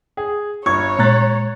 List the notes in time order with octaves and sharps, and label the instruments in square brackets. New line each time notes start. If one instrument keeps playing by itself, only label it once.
[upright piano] G#4
[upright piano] G1 C#6 G#6 [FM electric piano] F4 [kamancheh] C#5
[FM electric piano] A#2 G#3 [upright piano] A#5 F#6 A6